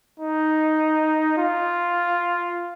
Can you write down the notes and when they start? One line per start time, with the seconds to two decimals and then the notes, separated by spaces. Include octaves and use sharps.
0.20 D#4
1.38 F4